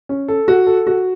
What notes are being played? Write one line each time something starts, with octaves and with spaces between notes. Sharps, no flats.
C#4
A4
F#4
A4
F#4